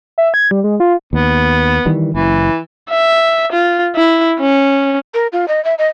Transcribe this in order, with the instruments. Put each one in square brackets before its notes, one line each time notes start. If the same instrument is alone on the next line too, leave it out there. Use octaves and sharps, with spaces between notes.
[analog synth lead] E5
G#6
G3
G#3
F4
[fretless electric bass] D#2 [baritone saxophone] B3
[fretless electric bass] D#3 E3 G3
[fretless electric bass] F#1 [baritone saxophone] E3
[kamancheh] E5
F4
E4
C#4
[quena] A#4
F4
D#5
E5
D#5